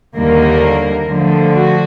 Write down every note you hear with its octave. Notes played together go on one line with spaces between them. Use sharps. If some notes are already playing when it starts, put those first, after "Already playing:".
D#2 D3 G3 A#3 A#4
D3 F3 A3
F#4